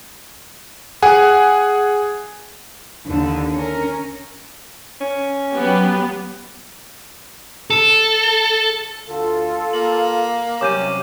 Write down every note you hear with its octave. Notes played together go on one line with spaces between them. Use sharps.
G#4 F#5 G#5
D#2 D3
C#4 A#4
C#4
F#3 B3 G4
A4
D2 F4 A4
A#3 F#7
C2 C3 F#3 C#4 D6 G6 D#7